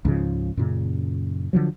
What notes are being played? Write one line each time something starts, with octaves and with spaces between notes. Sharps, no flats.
C#2 G#2 C#3 F3
F#2 A#2 C#3
D3 F3 F#3